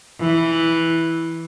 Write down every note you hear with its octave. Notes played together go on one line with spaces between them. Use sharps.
E3